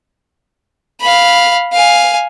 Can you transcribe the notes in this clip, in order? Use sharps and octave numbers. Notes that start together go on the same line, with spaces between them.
F5 B5
F5 G#5